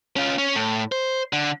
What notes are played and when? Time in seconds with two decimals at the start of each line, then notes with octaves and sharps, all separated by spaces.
0.16 C#4 F4
0.38 C#4
0.55 A2
0.92 C5
1.33 D3